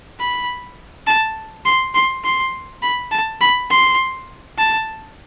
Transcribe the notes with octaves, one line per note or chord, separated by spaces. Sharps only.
B5
A5
C6
C6
C6
B5
A5
B5
C6
A5